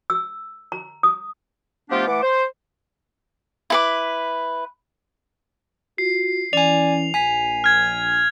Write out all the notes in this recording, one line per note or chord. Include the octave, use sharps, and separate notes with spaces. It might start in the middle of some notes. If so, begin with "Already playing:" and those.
E6
A#5
D#6
F3 A3 B3 D4 F4 G4
E3 A3 F#5 D6
C5
E4 B4 D6
F4 F#4 C7
E3 C#4 D5 G#5 F7
A#1 G#5 B6
F6 G#6